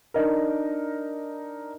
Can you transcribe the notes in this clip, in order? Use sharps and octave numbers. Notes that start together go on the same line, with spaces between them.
D4 D#4 A#4